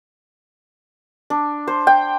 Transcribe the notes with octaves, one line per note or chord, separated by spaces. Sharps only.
D4
C5
G5